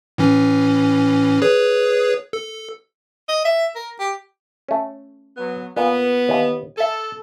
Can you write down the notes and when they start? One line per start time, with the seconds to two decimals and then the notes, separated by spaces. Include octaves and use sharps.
0.18 A2 E3 C#4
1.42 G#4 B4 C#5
2.33 A4
3.28 D#5
3.45 E5
3.76 A#4
4.00 G4
4.69 A3 C#4
5.36 F#3 B3
5.77 A#2 B3
6.29 D#2 E3
6.76 A4 E5 G#5